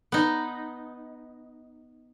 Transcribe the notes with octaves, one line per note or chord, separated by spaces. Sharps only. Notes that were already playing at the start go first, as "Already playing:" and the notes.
B3 D#4